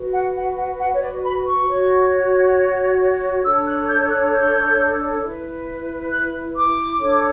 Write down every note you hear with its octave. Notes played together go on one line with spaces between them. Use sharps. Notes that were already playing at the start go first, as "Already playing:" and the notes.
Already playing: F#4 B4
F#5
F#5
F#5
F#5
C#5
D5
B5
C#6
F#4 C#5
D4 A4 C#5 E6
F#6
G6
F#6
G6
E4 B4
F#6
D6
D4 A4 C#5